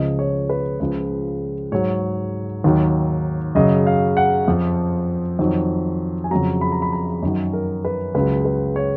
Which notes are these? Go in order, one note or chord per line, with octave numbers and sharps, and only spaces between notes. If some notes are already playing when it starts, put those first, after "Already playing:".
Already playing: C#2 C#3 F3 D#5
C#5
B4
C#2 C#3 F3 B4
G#2 F#3 C#5
D#2 D#3 F#3
F#2 C#3 F#3 D#5
F5
F#5
F2 F3
F2 D#3 F#3
G#5
F2 C#3 F#3 A#5
B5
A#5
B5
A#5
F#2 D#3 F#3
A#4
B4
C#2 C#3 F#3 B4
B4
C#5